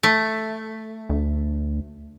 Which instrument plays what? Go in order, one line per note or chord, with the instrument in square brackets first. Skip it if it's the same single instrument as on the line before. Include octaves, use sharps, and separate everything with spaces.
[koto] A3
[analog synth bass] D2